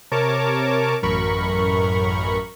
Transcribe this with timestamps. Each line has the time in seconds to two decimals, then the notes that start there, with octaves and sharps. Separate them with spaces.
0.11 C3 A#4 C#5 A5 D6
1.03 A1 F#2 A#4 B5 C#6